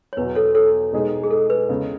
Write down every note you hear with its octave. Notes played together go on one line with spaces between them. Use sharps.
C#5
E2 B2 F#3 B4
A4 C#5
A4 C#5
B2 G#3 D#4 G#4
G#4
A4
B4
E2 C#3 G#3